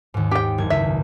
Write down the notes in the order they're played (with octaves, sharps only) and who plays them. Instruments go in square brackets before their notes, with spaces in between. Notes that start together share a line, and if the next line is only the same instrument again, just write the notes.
[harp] D#2 G#2
[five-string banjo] G4 G5
[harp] F#1 G#6
[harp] C#2 [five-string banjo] E5